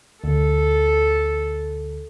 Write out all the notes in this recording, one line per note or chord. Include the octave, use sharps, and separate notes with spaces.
D2 A4